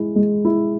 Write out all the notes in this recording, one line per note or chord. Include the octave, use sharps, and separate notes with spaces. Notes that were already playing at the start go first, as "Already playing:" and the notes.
Already playing: G#3 E4
G#3
E4